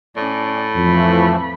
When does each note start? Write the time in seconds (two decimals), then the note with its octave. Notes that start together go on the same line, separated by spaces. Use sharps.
0.17 A2 C#4 D5
0.76 F2 E3 F3 A3 B5